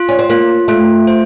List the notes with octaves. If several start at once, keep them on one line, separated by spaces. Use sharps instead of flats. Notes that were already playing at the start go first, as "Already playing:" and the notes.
Already playing: F4
C#4
C4
A#3 F4
A3 F4
C5